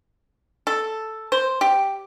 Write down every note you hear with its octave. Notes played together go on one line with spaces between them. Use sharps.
A4
C5
G4